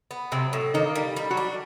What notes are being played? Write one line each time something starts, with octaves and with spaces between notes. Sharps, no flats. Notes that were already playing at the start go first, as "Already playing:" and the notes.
B3
C3 F#3 C4
A2
D#3 A#3 D#4
G3
G3
F#3 F#4
D4